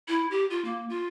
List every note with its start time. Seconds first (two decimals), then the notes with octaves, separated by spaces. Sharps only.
0.08 E4
0.31 G4
0.50 F4
0.65 A#3
0.89 F4